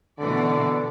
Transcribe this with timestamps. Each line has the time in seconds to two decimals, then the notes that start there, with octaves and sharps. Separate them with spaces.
0.19 B2 D3 E3 D5